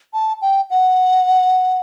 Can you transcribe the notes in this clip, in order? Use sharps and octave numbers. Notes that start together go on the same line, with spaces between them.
A5
G5
F#5